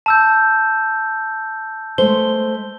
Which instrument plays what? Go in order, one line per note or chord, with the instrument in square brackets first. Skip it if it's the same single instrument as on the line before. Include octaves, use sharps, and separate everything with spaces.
[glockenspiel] A5 E6 G6
[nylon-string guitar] G#3 A3 C5 [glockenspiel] G7